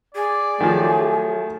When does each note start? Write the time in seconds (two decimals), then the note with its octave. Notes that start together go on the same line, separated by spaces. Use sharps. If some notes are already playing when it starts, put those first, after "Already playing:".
0.15 G#4 D5
0.61 D#3 F3 F#3 A3